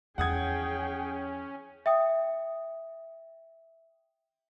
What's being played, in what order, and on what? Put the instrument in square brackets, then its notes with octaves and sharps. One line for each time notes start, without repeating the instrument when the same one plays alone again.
[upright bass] E2 F3 [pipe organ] C#4 [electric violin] G#4 G5 [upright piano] F#5 D#6 G#6
[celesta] E5 G5 D#6